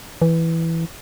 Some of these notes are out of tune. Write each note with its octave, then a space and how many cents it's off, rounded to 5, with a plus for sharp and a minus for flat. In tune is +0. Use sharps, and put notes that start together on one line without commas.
E3 +0